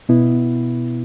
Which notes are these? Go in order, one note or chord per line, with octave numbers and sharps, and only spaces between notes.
B2 B3 E4